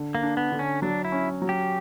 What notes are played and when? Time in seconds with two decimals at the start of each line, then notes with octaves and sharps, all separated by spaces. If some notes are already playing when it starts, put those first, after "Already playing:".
Already playing: D3
0.15 A#3
0.23 D4
0.37 B3
0.52 D3
0.59 C#4
0.82 F#3 D4
1.05 E4
1.12 C#4
1.42 F#3
1.49 G4